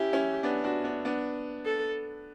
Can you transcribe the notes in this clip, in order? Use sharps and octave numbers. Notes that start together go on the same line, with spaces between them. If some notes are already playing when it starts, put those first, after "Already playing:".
Already playing: C#4 E4 G4
C#4 E4
B3 D4
D4 F#4
B3 D4
B3 D4
A4